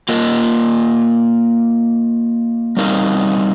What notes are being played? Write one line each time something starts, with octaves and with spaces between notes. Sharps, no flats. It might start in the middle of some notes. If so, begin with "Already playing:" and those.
A#3 F4 A#4 D#5
G3 C4 D#4 A#4 F5